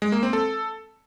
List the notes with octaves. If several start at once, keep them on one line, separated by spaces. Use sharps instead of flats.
G#3
A#3
C4
A4